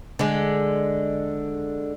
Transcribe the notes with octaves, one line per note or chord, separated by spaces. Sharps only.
D3 G#3